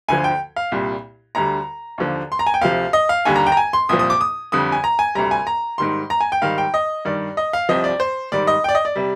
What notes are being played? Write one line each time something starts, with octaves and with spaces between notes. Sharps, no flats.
D2 D3 F3 G#5
G5
F5
C2 A#2 G3
D2 D3 G3 A#5
D#2 D3 F3
C6
A#5
G#5
G5
D2 C3 F3 F5
D#5
F5
D#2 D3 G3 G#5
A#5
G5
A#5
G#5
C6
C2 A#2 F3 D#6
D#6
D6
D#6
F2 D3 G3 D#6
G#5
A#5
G#5
D2 C3 G3 A#5
G#5
A#5
G#2 D#3 G3 C6
A#5
G#5
G5
G#2 D#3 G3 F5
G5
D#5
G2 D#3 G3 D5
D#5
F5
C2 C3 F3 D#5
D5
C5
G#2 D#3 G3 D5
D#5
D5 G5
D#5
D5
C3 G3